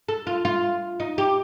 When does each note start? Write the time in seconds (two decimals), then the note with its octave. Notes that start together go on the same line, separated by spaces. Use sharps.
0.09 A4
0.27 F4
0.45 F4
1.00 D#4
1.18 G4